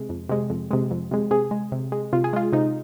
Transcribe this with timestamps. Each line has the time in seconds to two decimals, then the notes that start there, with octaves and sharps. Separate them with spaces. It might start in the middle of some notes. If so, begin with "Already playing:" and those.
Already playing: C3 G#3
0.09 F2
0.29 C3 G#3
0.50 F2
0.71 C3 G#3
0.91 F2
1.11 C3 G#3
1.31 C3 G#4
1.51 G#3
1.72 C3
1.92 G#3
2.13 C3 F4
2.24 G#4
2.33 G#3 F4
2.53 C3 D#4